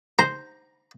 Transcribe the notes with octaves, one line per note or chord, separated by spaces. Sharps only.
C5 A#5